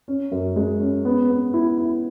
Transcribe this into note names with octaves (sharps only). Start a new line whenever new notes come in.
C#4
F#2
G#3
C#4
B3
B3
E4
E4